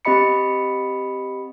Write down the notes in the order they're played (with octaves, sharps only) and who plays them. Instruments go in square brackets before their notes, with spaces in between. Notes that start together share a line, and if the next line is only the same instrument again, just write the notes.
[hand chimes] C4 G4 D#5 B5 C#7